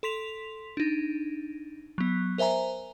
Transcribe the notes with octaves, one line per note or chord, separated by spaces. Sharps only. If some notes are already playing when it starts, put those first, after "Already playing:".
A4 C6 B6 F7
D4 D#4
F#3 B3
A#4 C5 E5 G#5 A#5